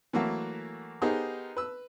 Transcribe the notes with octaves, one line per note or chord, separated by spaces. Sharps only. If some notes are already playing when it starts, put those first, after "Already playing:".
E3 F#3 A3 A#3 E4 F#4
B3 D#4 G4 G#4 A#4 C5
B4 E6